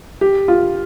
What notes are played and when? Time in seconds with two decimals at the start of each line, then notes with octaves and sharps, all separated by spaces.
0.21 G4
0.48 F4